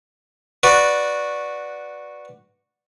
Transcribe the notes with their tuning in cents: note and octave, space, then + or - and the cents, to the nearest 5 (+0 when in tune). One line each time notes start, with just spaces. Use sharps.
F#4 -10 B4 +0 D5 +0